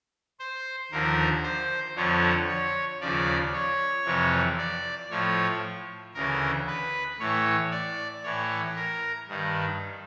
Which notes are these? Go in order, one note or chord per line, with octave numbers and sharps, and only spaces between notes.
C5
D#2 D3 F3 A#4
C5
F2 D3 F3 C#5
C#5
D#2 C#3 F3 D5
C#5
F2 C3 E3
D5
A2 F3 C#5
D2 C#3 E3 A#4
B4
A2 E3 C#5
D5
A2 E3 C#5
A#4
G2 D#3